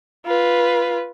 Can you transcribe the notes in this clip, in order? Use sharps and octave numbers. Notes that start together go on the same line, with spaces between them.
F4 B4